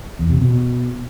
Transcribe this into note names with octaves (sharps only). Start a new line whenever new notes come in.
E2
C3
B2